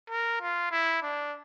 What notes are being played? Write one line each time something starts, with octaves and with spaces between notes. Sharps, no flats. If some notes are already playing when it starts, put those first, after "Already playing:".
A#4
F4
E4
D4